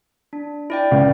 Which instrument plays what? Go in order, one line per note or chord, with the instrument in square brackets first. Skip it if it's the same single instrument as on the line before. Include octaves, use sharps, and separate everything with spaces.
[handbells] D4
E4 D5 G5
[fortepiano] C#2